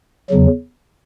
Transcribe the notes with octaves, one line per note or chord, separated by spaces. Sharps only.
E2 C#3 F#3